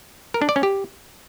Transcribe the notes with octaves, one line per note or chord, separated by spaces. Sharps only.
A#4
D4
D5
C#4
G4